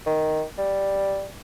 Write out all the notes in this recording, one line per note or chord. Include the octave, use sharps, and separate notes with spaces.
D#3
G3